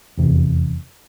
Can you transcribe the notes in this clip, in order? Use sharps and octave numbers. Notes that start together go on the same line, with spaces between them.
F1 E2 C3